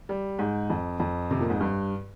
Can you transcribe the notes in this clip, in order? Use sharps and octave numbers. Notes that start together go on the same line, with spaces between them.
G3
G#2
F2
F2
C3
A#2
G#2
G2